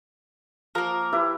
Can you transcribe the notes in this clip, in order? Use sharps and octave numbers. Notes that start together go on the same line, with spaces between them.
F3 A#3 A#4
E4 G4 B4